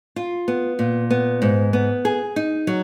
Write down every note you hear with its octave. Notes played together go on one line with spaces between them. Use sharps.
F4
B3
A#2
B3
G#2
B3
G#4
D#4
F#3